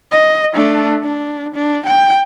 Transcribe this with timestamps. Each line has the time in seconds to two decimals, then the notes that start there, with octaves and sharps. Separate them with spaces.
0.11 D#5
0.54 A3 D4
1.03 D4
1.55 D4
1.86 G5